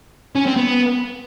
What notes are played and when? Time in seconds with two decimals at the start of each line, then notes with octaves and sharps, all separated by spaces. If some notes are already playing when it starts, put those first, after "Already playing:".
0.35 C#4
0.46 C4
0.56 B3